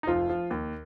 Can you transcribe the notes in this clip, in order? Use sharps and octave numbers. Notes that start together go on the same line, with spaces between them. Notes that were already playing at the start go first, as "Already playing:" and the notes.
D#4
F1 F3 F4
F3
D#2